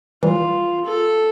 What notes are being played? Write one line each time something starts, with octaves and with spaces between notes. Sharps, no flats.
E3 G3 F4
A4